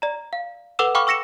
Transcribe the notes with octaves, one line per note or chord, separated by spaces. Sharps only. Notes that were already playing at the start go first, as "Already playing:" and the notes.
D5 A#5
F5
A4 B4 F#5 D6 E6 E7
F5 G5 B5 C#6 D6 F6
C#6 E6 A#6 C#7 E7